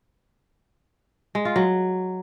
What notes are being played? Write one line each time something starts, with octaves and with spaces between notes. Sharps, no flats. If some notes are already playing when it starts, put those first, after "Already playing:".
G#3
F4
F#3